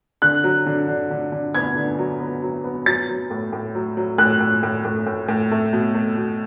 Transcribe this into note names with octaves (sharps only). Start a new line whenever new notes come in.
D3 F#6
F#3
D3
D3
D3
D3
B3 G#6
D3
F#3
B3
F#3
B3
F#3 A6
F#3
A2
A2
F#3
F#3
A2 F#6
A2
A2
A2
A2
A2
A3
B2
A3
B2